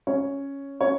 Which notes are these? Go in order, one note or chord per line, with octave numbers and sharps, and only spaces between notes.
C#4 C#5
C#4 C#5